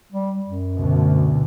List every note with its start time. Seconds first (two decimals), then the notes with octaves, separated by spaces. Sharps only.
0.12 G3
0.46 F#2
0.76 D2 B2